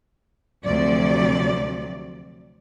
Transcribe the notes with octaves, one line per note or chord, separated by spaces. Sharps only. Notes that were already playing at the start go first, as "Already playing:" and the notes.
D2 C3 F3 F#3 D5